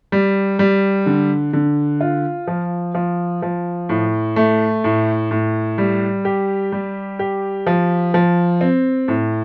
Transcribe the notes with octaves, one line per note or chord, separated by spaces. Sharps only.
G3
G3
D3
D3
F4
F3
F3
F3
A2
A3
A2
A2
G3
G4
G3
G4
F3
F3
C4
A2